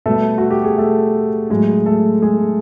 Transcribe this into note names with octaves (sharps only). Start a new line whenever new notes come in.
B2 G3 A3 A4
F#4
G4
G#4
A3 A4
A2 F#3 G#3 G#4
A3 A4
G#3 G#4